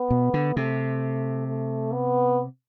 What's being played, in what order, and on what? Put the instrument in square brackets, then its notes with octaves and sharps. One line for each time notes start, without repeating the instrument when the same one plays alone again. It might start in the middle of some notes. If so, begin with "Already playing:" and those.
Already playing: [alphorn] B3
[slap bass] B2
D3
[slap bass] C3 [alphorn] A3
[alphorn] A3
B3